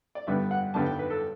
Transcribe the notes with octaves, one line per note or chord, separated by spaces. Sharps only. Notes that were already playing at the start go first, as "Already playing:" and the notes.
D5
G2 D3 G3 B3 E5
F#5
G2 D3 G3 B3 A5
G5
B4
A4